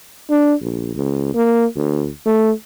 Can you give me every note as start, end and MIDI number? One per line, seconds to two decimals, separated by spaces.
0.30 0.54 62
0.61 0.91 34
0.95 1.32 37
1.35 1.65 58
1.76 2.09 38
2.26 2.51 57